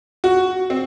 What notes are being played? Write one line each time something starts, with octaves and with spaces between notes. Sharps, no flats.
F#4
C4